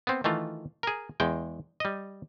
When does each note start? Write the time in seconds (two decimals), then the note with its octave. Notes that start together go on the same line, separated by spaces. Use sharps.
0.07 B3 C4
0.24 D#3 E3 A3 F4
0.83 G#4 A#4
1.20 E2 G#3 G5
1.80 G3 D#5